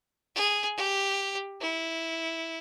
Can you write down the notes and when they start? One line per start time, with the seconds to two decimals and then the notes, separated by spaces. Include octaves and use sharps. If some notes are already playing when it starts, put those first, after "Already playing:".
0.35 G#4
0.77 G4
1.61 E4